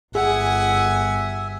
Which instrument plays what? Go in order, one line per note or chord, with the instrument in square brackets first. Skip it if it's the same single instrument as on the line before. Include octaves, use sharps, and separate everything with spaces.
[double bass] G1 [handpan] G#4 [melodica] E5 [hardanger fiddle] F#5 G#5